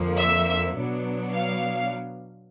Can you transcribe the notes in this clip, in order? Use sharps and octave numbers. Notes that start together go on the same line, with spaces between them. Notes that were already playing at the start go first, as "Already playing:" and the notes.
Already playing: F2 D3 F3 A#3
E5
B2 F#3 B3 D4
F5